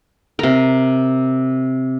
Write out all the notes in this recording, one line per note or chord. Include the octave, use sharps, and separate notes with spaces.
C3 A#4